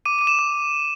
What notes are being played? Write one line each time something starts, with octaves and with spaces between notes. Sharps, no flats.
D6 D#7
D6 D#7
E7
D6